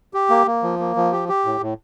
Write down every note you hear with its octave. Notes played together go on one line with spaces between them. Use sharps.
G4
A#3
A#3
F3
A#3
F3
G4
G4
A2
A2